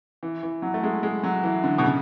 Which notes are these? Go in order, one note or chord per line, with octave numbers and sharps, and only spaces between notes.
E3
E3
F#3
A3
G#3
G#3
F#3
E3
D3
B2
C#3